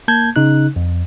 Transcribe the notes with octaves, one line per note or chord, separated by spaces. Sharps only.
A#3 A5 G6 G#6
C#3 D#4 F#6
F2